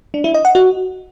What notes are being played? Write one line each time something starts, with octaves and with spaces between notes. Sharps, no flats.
D4
E4
D#5
F#5
F#4